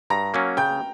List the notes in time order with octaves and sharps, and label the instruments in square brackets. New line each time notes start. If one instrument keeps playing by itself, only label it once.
[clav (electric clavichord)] G2 [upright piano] A#5 A#6
[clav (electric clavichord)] F#3 A#3 C#4
[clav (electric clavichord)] C#3 [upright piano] G5 G6